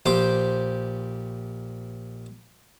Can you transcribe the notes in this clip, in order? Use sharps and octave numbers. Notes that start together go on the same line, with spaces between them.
A#1 G4 C5 D6